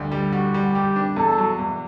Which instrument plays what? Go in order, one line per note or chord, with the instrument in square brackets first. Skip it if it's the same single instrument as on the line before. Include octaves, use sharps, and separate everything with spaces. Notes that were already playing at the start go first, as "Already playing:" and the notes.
Already playing: [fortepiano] D2 G3
G3
[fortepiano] G3 [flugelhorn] F#4
[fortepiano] G3
[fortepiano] G3 [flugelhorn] G4
[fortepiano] D4
[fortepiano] E2 [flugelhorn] A4
[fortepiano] F#3
E2